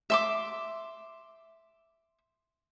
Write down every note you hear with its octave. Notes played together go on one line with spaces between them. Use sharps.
E5 C6 D6